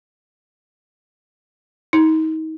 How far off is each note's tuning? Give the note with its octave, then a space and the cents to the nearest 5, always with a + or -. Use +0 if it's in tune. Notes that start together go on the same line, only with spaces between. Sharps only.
D#4 +35